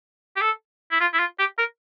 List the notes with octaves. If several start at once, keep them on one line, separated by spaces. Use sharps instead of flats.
G4
A4
E4
F4
E4
F4
G4
A#4